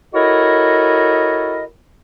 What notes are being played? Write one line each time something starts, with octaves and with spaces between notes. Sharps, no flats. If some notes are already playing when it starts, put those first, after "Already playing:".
E4 F#4 A4 A#4 C#5 D#5